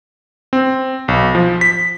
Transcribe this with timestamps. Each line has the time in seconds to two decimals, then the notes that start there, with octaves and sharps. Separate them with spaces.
0.53 C4
1.08 B1
1.35 F3
1.61 B6